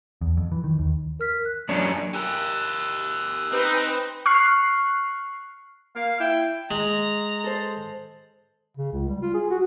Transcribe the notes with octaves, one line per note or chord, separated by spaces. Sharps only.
E2
F2
E3
D#3
D#2
A#4 F6 B6
F#6
F#2 D4 C#5
G4 A#4 G#5 E6 F#6
C4 D#4 B4
C#6 F6 F#6 C7
A#3 F5
E4 G5
G#3 A#5
A4 C5
C#3
C#2
G3
F4
G#4
F#4